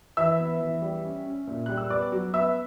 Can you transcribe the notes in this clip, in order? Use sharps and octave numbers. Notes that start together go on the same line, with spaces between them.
E3 E5 E6
B3
E3
G3
C#4
C#4
A#2
G3 F#6
E6
B3 D5 D6
F#3
B3 E5 E6